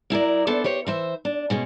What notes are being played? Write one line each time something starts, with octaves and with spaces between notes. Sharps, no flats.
F#3 E4 A#4 D5
B3 D4 A4 C5
G4 C5 C#5
E3 C5 E5
D4
B2 G#3 C#4